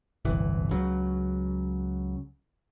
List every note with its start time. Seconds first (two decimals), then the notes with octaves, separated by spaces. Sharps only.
0.25 D1 G1 C2 E3
0.71 C#2 C#3 F#3